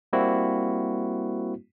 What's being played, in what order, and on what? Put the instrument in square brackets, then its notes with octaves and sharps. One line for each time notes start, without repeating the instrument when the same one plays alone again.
[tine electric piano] G3 A#3 C4 E4 F#4